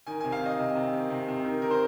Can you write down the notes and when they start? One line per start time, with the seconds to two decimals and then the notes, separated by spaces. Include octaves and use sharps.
0.07 D#3 G#5
0.20 C3 G#5
0.32 F5
0.41 D#3 D#5
0.59 C3
0.75 C3
0.93 D#3
1.10 C3
1.28 C3
1.44 D#3
1.62 D#3 A#4
1.71 C5